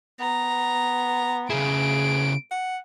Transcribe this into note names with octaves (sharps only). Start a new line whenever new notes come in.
B3 A#5
C#3 E4 G#4 D7
F#5